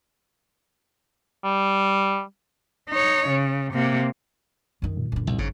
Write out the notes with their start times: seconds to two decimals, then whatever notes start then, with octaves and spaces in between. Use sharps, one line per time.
1.44 G3
2.90 D#4 C#5
3.28 C#3
3.73 C3 A#3
4.82 F#2 D#3
4.97 A#2
5.12 F#2 D3
5.27 C2 A#2
5.38 G#1 G#2 C#3